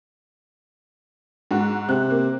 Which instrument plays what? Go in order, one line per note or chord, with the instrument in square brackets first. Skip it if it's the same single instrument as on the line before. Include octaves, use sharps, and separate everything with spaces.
[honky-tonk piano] G#2 F#4
[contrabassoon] C3 [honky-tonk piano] F#6
[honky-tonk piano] A#3